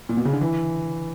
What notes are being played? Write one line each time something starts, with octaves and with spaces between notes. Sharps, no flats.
A#2
B2
C#3
D3
E3